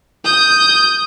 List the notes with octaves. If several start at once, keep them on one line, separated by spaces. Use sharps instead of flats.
D#6 G6